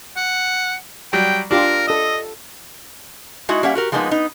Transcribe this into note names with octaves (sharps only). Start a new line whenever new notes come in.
F#5
F#3 G3 G5
D4 F4 G4 A#4 D6
A4 D#5 E6
G#3 D#4 E4 F#4
G3 A#3 C#4 E5 F#5
F#4 G4 A#4
F3 G#3 A#3 B3 D#4
B3 D#4